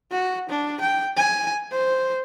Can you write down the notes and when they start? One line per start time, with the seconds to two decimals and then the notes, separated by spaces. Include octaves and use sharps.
0.11 F#4
0.49 D4
0.81 G5
1.17 G#5
1.72 C5